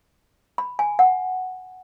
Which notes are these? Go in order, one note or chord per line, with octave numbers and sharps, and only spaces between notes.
B5
G#5
F#5